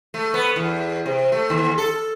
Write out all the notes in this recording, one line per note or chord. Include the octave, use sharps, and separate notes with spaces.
A3
B3
E2
C3
A3
D#2
A4